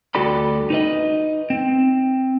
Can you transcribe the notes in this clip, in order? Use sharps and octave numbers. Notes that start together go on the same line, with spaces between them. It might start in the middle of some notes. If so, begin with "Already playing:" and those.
D2 G3 F#4 A4 D5 B5
D#4 B4 D#5
C4